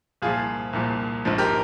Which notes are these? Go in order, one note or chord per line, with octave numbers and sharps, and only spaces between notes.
C2 A#2 F3 F4 G#4
C2 A#2 F3
A#1 G#2 F3
G4 A#4